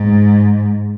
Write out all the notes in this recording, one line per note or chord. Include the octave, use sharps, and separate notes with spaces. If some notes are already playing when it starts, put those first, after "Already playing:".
Already playing: G#2